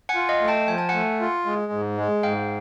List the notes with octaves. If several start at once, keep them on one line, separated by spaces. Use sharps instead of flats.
F#5 G#5
F4
D#5 F5
A3
G5 A5
F3 G#5
A5
A3 F#5 G#5
F4
G#3
G#2
G#3
G#2 F5 G5